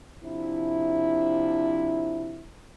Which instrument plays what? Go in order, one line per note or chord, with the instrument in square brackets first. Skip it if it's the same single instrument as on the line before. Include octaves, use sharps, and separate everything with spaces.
[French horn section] C3 F3 D4 E4